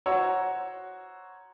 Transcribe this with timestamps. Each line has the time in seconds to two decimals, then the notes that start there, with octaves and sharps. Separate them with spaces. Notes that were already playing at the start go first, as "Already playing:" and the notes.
0.06 F#4 C5 C#5 F#5 A#5 E6